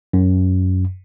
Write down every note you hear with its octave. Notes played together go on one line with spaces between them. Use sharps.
F#2